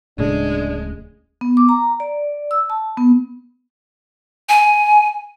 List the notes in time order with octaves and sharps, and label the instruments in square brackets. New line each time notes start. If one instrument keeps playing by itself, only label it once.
[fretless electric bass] D1 A2 C#3 [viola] G#3 [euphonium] D4
[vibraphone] B3
D6
A#5
D5
E6
A5
B3
[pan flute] G#5